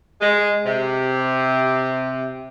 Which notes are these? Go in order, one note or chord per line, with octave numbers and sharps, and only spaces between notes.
G#3
C3